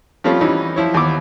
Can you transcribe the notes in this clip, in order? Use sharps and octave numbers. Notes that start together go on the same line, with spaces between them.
F3 G3 A3 C4 C#4 F4
E3 G3 C#4 D#4
F3 E4 C#5
D#2 E3 B3 D6